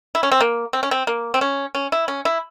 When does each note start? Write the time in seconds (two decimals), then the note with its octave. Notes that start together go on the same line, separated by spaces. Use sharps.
0.15 E4
0.23 C#4
0.32 C4
0.41 A#3
0.73 C4
0.83 C#4
0.91 C4
1.07 A#3
1.34 C4
1.41 C#4
1.75 C#4
1.92 E4
2.08 C#4
2.25 E4